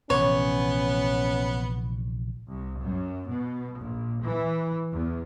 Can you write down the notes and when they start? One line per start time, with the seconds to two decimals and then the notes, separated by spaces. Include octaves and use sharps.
0.10 A#1 C3 E3 B3 C#4 C#5
2.50 C2
2.82 F#2
3.27 B2
3.80 A#1
4.23 E3
4.90 E2